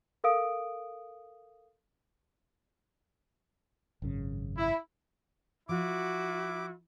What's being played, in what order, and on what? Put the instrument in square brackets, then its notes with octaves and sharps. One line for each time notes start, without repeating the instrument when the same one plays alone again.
[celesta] A4 A#4 F5 D#6 D7
[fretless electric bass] G#1 F#2 C#3
[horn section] E4
[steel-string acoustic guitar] F3 [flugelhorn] E4 [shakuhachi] F#4 [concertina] D6